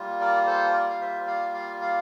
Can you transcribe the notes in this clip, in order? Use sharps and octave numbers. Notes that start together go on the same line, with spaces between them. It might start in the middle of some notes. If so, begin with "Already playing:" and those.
Already playing: G3 A#3 F4
A#4 D5
A4 C5
A#4 D5
F5
C5 E5
D5 F5
D5 F5
D5 F5